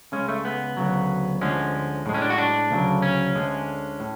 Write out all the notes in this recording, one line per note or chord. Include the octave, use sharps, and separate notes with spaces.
C#2 C#3 G#3 C#4
A3
B3
D2 C#3 F#3
D2 D3 F3 G#3 C#4
A2 G#3
C#4
D4
F#4
D4
D2 C#3 F#3
C#4
D2 D3 G#3
A2